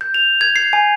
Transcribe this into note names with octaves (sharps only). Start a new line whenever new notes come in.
G6
F7
G#6
C7
G#5